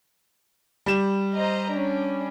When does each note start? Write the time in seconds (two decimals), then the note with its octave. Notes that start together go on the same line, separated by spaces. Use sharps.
0.86 G3 E7
1.33 C5 D#5 A#5
1.70 C#4 D4